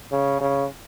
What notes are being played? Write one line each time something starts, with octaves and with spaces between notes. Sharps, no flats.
C#3
C#3